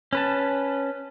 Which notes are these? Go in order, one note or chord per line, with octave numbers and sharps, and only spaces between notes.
C#4 B4 A5